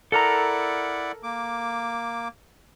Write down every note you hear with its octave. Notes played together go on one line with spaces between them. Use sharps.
E4 A4 A#4 D5 F#5 A#5
A#3 D6